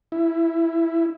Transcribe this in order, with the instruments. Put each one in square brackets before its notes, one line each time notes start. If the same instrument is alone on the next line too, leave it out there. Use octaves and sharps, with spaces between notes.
[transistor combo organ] E4